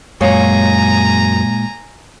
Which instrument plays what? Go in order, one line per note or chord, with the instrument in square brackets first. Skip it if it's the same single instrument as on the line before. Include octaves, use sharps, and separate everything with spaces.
[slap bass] F#2 [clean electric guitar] A#2 G#3 F5 [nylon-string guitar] C#5 [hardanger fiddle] G#5 A#5